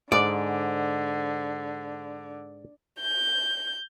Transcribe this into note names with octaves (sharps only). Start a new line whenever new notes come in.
G#2 D3 D5
G6